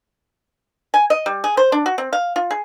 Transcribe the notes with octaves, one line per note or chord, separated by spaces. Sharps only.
G#5
D#5
G3
G#4
C5
D4
F#4
C4
F5
F4
G#4